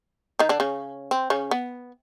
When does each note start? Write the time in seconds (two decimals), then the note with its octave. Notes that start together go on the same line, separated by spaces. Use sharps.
0.39 D#3 D#4
0.49 D3 D4
0.60 C#3 C#4
1.11 C4
1.30 C#3 C#4
1.51 B3